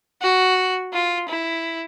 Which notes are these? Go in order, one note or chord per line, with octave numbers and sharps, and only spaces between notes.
F#4
F4
E4